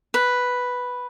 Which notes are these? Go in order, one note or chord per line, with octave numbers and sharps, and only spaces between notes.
B4